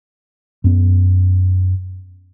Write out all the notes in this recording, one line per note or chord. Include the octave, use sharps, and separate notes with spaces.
F#2 B3